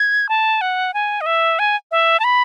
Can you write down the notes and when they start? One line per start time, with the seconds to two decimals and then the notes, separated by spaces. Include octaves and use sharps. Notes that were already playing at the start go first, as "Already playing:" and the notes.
Already playing: G#6
0.29 A5
0.61 F#5
0.94 G#5
1.21 D#5
1.26 E5
1.59 G#5
1.91 E5
2.20 A5
2.24 B5